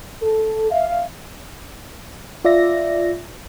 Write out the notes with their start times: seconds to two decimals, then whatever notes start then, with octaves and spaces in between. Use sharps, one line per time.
0.23 A4
0.71 E5 F5
2.45 F4 D5 E5 A#6